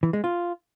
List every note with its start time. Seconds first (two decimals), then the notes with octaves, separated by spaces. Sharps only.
0.03 E3
0.13 G#3
0.24 F4